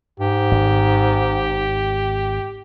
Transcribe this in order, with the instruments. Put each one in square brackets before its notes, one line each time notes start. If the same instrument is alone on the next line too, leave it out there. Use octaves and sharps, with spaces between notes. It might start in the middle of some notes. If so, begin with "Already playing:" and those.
[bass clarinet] G#2 [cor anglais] G4
[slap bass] G#1